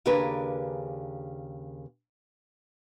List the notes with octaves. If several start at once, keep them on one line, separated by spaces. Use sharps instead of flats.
D#2 C#3 D4 G#4 A#4 B4